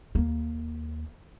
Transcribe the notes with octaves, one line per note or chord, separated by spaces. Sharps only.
D#2 A#3